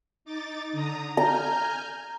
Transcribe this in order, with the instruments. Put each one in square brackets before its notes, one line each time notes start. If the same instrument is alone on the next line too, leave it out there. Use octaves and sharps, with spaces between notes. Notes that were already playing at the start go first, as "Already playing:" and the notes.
[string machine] D#4 D6 A6
D3 A#5 D#6
[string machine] G#5 F6 G6 [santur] A#5